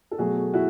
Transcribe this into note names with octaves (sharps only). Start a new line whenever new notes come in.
A4
B2 F#3 A3 F#4 G#4
E4 F#4